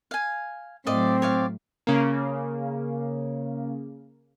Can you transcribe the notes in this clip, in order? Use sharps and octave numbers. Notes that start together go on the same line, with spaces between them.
F5 G#5
A2 F#3 C4 D5 D#5 F5
C#5 D5 F5
C#3 A#3